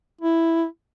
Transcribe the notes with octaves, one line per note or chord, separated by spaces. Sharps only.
E4